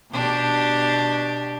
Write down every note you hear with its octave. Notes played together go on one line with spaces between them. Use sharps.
B2 D4 G4